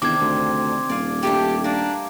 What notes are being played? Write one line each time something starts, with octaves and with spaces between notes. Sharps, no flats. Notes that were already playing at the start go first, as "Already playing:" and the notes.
E2 C3 D#3 D4 D6 G#6
D2 C4
D#1 D5 F5 G#5
G3 A3 D4 G4
A#3 D4